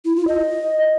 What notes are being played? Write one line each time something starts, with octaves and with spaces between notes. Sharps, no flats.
E4
F4
D#5